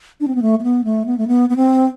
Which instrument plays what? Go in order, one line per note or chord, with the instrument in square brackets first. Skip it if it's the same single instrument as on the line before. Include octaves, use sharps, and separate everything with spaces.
[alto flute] D4
C4
B3
A3
A3
B3
A3
B3
A3
B3
B3
C4